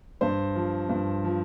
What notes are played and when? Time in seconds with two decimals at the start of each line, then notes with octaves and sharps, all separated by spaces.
0.21 G2 C5
0.55 F3
0.89 G2
1.24 F3